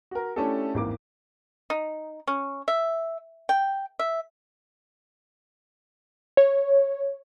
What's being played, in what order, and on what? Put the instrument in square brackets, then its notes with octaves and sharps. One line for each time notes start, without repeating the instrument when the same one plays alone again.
[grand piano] F#4 A#4
A3 C#4 D4 E4 G4 A4
G#1 E2 A#3 D6
[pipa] D#4
C#4
E5
G5
E5
[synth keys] C#5